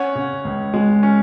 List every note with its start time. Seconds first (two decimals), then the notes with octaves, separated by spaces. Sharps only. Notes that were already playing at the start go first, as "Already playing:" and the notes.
Already playing: C#4 C#5 F#5
0.15 C#3
0.45 C#2
0.74 G#3
1.03 C#4